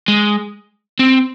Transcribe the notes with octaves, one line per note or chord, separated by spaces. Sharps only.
G#3
C4